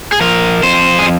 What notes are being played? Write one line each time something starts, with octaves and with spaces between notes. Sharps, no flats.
G#4
F3 A#4
F2 C5
G#4